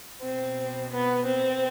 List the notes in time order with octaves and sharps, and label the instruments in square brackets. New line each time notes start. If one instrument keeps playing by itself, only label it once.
[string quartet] B2 C4
B3
C4